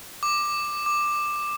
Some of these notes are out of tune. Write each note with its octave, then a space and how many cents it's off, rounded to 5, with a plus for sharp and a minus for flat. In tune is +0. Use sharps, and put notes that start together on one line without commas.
D6 +15
D6 +15